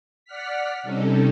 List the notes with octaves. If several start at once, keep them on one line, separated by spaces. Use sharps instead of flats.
D5 F#5 F6 B6
C3 G3 C#4 D#4 A4